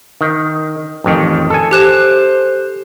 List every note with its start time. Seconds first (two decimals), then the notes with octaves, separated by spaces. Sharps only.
0.21 D#3
1.04 A1 F2 D#3
1.50 A4 G#5
1.71 G4 C5 F#6 E7